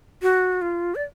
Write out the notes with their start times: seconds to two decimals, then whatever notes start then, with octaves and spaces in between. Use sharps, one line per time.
0.22 F#4
0.62 F4
0.95 D5